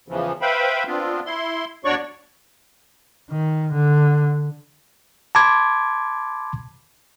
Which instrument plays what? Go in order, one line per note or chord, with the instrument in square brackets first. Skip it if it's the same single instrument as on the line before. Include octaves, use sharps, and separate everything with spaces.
[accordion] E2 C#3 E3 F3
B4 C5 E5 F5 G5 B5
B3 C4 D4 F4
E4 C6
E2 D4 F#4 C#5 D5 C#6
[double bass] D#3
D3
[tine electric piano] A5 B5 C6 D6 G#6